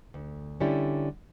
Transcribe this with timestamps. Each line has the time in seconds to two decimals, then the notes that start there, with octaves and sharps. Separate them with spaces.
0.14 D2
0.60 D3 G3 C#4 E4